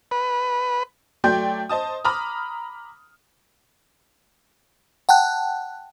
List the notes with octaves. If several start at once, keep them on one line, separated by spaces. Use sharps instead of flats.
B4
F#3 A3 D5 G5 C6 G6
C5 D#5 A5 D#6
A#5 B5 D6 D#6 F6
F#5 G5 A5 F#6